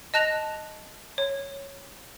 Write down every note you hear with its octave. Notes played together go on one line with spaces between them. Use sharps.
D#5 A5 F#6 A#6 F7
C#5